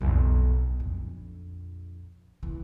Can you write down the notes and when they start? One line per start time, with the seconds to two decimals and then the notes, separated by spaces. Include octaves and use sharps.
0.01 B1 F2
0.80 A#1 F2
2.43 E3